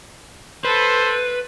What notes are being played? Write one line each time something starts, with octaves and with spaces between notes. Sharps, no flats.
A4 B4 C5